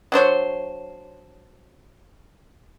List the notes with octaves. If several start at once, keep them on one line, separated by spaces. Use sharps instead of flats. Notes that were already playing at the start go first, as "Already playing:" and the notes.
F#3 D4 C5 C#5